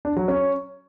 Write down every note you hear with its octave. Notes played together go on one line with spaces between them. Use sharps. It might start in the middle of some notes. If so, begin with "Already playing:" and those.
D4
F#3
C#4